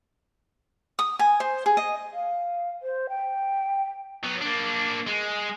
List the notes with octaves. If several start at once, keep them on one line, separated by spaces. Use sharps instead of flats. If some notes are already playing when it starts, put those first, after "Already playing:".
D#6
G#5
C5
G#4
D#5
F5
C5
G5
F#3 B3
A#3 D4
G#3